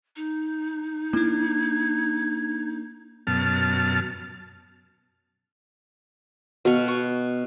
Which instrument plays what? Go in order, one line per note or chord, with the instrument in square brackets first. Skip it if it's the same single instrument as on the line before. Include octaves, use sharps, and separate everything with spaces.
[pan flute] D#4
[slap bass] A#3 D4 [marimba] E4 [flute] G#6
[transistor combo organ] F#2 B2 A5 F6
[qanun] B2 B3 F5 C#6
C#6